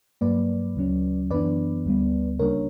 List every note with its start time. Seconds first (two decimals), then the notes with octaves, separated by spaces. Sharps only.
0.21 G2 F#3 A#3 B4 D5
0.76 D2 C#3 F#3 C#4
1.31 F#2 E3 B3 D4 B4 D5
1.85 D2 D3 G3 B3
2.39 C#2 C#3 G3 A#3 D4 A#4 C#5